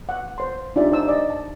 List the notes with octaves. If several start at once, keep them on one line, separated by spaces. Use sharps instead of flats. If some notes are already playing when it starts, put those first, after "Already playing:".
F#5
C5 C6
D4 D#4 F4 G4 D5 E5
D#4 C5 A5 E6
D5 D#5
A5